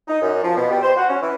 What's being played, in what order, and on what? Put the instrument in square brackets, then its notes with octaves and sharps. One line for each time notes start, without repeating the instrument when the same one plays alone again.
[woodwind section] D#4
F#2
F3
B2
G3
C5
F#4
C#4
E3